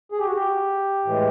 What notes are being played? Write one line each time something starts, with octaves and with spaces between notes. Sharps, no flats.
G#4
G4
F#4
G4
A2 E3 G#3